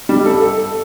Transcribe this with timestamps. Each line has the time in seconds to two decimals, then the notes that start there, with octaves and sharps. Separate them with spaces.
0.09 G3
0.25 A4
0.42 A4
0.59 A4